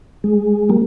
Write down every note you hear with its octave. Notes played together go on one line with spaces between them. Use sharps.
G#3
G3 A#3